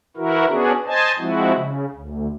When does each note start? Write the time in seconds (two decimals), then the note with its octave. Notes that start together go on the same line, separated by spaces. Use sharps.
0.17 E3 E4 F#4 A#4
0.50 B3 C#4 D4 F#4 G#4
0.86 C5 D#5 G#5 A5
1.19 F3 G#3 C4 E4 F#4
1.54 C#3
1.94 D2